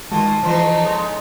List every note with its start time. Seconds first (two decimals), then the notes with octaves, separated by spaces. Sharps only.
0.12 D#3 G#3 F4 F#4 A5
0.43 C#3 E3 F3 D#4 F4 A4
0.81 G#3 B3 C#4